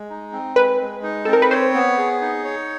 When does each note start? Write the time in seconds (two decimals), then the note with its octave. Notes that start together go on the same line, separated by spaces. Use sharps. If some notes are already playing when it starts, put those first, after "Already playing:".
Already playing: G#3
0.10 D#4
0.32 C4
0.56 G#3 B4
0.81 G#3
1.03 D#4
1.25 C4 A4
1.33 A#4
1.42 B4
1.51 C5 C#5
1.74 B3
1.98 G#4
2.22 D#4
2.44 C#5